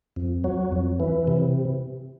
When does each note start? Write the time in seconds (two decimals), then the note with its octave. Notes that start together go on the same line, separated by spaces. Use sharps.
0.16 F2
0.44 F#3
0.72 F2
1.00 E3
1.27 C3